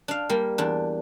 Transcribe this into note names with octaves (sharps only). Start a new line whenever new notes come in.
D4 F5
G3 A#3
E2 D4